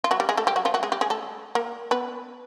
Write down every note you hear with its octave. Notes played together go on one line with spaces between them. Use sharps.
F4
F#3 F#4
G3 G4
G#3 G#4
A3 A4
G3 G4
F#3 F#4
F3 F4
F#3 F#4
G#3 G#4
G3 G4
G#3 G#4
A3 A4
A#3 A#4
B3 B4